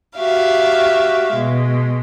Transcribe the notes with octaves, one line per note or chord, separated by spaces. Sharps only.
F#4 G4 E5 F5
B2 G#3